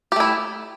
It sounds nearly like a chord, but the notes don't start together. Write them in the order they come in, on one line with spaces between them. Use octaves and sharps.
G4 A3 E4